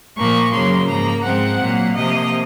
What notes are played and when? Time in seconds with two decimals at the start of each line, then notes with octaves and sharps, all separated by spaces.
0.17 A#2 F3 A#3 C#6
0.53 F#2 C#3 F#3 A#3 C6
0.89 G#2 F3 A#3 A#5
1.24 G#2 F3 G#3 C4 F#5
1.60 A#2 F#3 A#3
1.96 C3 F3 A#3 D#5